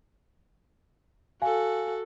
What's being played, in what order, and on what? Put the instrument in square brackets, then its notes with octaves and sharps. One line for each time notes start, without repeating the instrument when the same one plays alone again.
[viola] F#4 A4 [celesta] F5 G#5